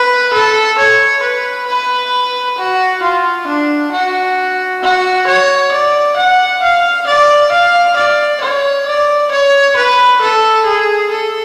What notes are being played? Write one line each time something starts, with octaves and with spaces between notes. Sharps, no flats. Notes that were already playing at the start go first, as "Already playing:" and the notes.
Already playing: B4
A4
C#5
B4
B4
F#4
F4
D4
F#4
F#4
C#5
D5
F#5
F5
D5
F5
D5
C#5
D5
C#5
B4
A4
G#4
A4